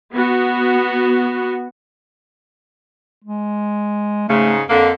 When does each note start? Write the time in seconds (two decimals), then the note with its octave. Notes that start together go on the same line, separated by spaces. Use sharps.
0.13 B3 F#4
3.24 G#3
4.29 G#2 C#3 A3
4.69 F2 D3 A#3